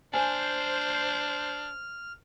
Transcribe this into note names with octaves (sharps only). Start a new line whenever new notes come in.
D4 C5 G#5 F6